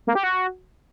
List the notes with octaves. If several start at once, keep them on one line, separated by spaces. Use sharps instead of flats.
A#3
G4
F#4